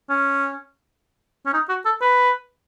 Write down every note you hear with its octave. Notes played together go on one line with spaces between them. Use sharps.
C#4
C#4
D#4
F#4
A4
B4